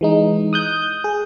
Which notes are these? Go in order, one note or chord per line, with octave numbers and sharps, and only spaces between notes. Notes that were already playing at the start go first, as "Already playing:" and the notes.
E3 G#3 D#4
D#6 F#6 G6
G#4